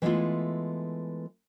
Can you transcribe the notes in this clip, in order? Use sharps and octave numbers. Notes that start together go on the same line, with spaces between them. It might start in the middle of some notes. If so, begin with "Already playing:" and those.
E3 G#3 A3 B3 E4 F4